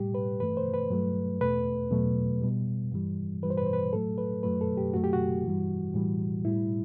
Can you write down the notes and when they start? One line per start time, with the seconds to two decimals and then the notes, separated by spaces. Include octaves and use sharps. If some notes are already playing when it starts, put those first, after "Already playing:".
Already playing: A2 G3 G4
0.14 B4
0.40 G2 E3 A3 B4
0.57 C5
0.74 B4
0.90 G2 F#3 A3
1.41 E2 B2 A3 B4
1.91 E2 B2 F#3 A3
2.41 B2 G3
2.92 G2 E3 G3
3.43 G2 E3 G3 B4
3.50 C5
3.58 B4
3.66 C5
3.73 B4
3.93 A2 F#3 A3 A4
4.18 B4
4.43 F#2 F#3 A3 B4
4.61 A4
4.77 G4
4.93 F#2 F#3 A3 F#4
5.04 G4
5.13 F#4
5.45 G2 E3 G3
5.94 A2 E3 G3
6.45 A2 G3 E4